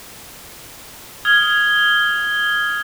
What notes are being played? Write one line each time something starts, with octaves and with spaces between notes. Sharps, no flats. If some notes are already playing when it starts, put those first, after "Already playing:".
D#6 F6 G#6 G7